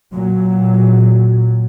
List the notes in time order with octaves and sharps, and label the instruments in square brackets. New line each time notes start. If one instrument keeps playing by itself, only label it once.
[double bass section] A#2 F#3